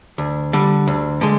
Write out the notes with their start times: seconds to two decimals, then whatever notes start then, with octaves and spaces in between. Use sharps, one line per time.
0.18 D2
0.53 D3 G3
0.87 D2
1.21 D3 G#3